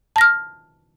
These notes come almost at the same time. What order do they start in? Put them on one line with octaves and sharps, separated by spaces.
A5 A#6 F6